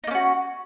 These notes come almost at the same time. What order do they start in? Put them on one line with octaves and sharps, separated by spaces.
D#4 A#3 C#4 F#4